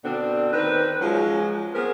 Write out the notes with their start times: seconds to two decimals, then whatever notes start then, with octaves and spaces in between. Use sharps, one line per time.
0.04 B2 D3 C4 D4
0.52 D#3 C4 B4
1.00 F3 F#3 G#3 C#4
1.73 B3 C4 G#4 A#4